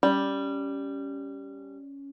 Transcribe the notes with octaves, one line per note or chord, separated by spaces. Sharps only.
G3 C#4